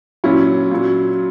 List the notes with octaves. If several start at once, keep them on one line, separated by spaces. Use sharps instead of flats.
A#2 F#3 C#4 E4
A#2 F#3